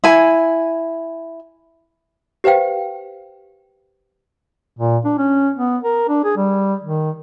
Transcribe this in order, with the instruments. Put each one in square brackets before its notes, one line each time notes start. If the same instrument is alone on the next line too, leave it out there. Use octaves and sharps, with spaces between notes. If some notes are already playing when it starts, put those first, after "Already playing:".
[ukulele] E4 G#5
[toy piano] G4 B4 C5 F5 G5
[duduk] A#2
D4
C#4
B3
A#4
D4
G#4
G3
D#3